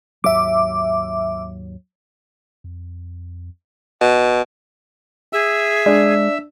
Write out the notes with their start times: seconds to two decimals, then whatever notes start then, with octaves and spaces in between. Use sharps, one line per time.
0.24 D#2 G#2 F#3 E5 D6
2.64 F2
4.01 D1 B2
5.33 G#4 E5 E6
5.86 G#3 D4